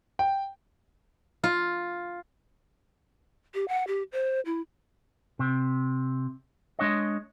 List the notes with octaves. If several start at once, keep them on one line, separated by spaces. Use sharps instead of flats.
G5
F4
G4
F#5
G4
C5
E4
C3
G#3 D4 C#5 D#5